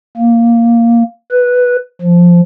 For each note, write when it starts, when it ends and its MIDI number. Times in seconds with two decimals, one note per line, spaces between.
0.17 1.03 58
1.31 1.76 71
2.02 2.41 53